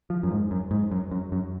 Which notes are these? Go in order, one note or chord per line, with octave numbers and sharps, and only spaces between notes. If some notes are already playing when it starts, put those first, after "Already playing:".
F3
F#2
G#2
F#2
G#2
F#2
F#2
F#2